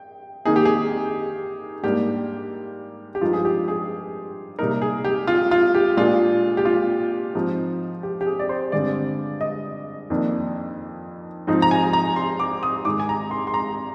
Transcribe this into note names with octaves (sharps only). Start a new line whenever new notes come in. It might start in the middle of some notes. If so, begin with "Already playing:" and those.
Already playing: G5
D#3 A#3 D#4 G#4
G4
G#4
G#2 G3 A#3 D4 G4
G4
G2 F3 G#3 D#4 F4
G#4
G4
G#4
C3 G3 A#3 D#4 A#4
G#4
G4
F4
F4
G4
A#2 G#3 D4 F4
G4
F4
G#2 F3 C4 D#4
G4
G4
G#4
D5
C5
G2 D3 G#3 C4 D5
D#5
F2 D#3 A#3 D4
G#2 F3 C4 D#4
A#5
G#5
A#5
C6
D6
D#6
G#2 D#3 G#3 D6
G#5
A#5
C6
C6
A#5